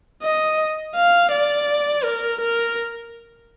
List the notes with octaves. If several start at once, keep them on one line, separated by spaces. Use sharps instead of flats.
D#5
F5
D5
A#4
A#4